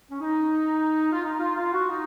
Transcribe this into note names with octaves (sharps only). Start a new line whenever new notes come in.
C#4
D#4
F4
D#4
D#4
F4
F4
F#4
D#4